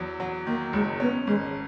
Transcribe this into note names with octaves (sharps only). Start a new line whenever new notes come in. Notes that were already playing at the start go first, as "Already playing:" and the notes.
Already playing: E2 F#3
F#3
D#3 A#3
F#1 G#3
B3 C#4
G#1 G#3